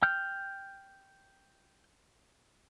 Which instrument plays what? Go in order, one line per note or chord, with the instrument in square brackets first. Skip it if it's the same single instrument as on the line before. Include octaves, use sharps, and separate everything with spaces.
[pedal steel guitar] G5 F6 G6